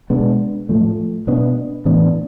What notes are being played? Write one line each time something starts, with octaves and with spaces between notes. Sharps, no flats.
B2 G#3 B3 D4
A2 F3 A3
B2 B3 D4
A2 E3 B3 D4